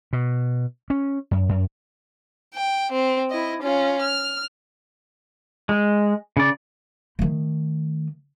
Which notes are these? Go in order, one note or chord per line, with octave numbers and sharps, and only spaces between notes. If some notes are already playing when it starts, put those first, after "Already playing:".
B2
C#4
F#2
F#2
G5
C4
E4 D#5
C#4 F4
F6
G#3
C#3 D5
D#3 A3